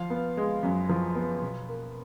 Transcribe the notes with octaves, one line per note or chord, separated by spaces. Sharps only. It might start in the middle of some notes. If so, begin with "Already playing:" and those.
Already playing: F3 F5
B3
G#3
F#2
F3
B3
B2
A#3